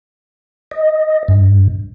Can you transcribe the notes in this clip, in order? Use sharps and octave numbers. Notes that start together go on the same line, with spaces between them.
D#5
G2